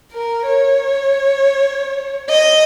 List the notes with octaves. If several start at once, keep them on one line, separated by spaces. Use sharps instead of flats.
A#4
C#5
D#5